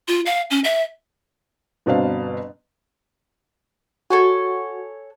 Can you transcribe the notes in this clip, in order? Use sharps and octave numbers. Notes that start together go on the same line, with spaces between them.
F4
F5
C#4
E5
G1 B2 C4 D4 F5
F#4 A4 C#5 G#5